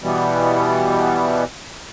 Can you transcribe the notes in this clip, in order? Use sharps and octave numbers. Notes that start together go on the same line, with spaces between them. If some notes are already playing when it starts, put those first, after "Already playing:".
B2 E3 G3 B3